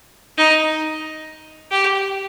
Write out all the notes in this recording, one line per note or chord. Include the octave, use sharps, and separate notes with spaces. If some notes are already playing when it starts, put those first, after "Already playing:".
D#4
G4